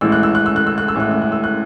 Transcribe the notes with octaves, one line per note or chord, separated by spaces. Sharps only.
A1 A2 G#3 E6
F#6
E6
F#6
E6
F#6
E6
F#6
E6
A1 A2 G#3 F#6
E6
F#6
E6
F#6